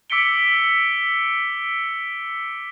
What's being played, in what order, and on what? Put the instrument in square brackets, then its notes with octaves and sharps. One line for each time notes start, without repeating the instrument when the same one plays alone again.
[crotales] D6 E6 B6 C#7 D7 G7